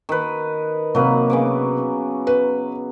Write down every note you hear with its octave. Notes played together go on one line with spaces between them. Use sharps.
D#3 B4
C3 F#3 A#3 B4
C#3 B3 D6
B4